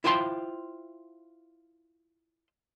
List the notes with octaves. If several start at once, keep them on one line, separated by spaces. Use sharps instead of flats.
E4 F4 C5 G5 G#5 C6